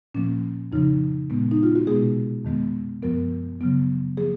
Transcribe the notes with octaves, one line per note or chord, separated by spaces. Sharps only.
A#2 F3 A#3 C#4
F2 C#3 F3 D#4
A#2 G#3 B3
D#4
F4
F#4
B2 G#3 B3 G#4
F2 D#3 G#3 B3
F#2 F3 B3 A#4
C#3 F#3 B3
F3 A#3 G#4